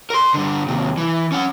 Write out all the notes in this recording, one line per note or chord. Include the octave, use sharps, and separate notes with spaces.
A#4 C6
G2 D3
D#2 C3
E3
C#4 F#5